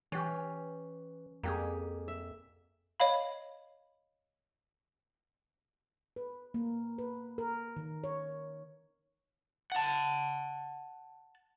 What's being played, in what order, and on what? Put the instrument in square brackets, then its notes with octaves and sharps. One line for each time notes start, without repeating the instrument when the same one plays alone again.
[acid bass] E3 [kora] C#4 G4
[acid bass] F2 [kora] A#3 G4 G#4
[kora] E5
[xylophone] C#5 D#5 F5 B5
[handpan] B4
A#3
B4
A#4
D#3
C#5
[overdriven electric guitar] F#5 A5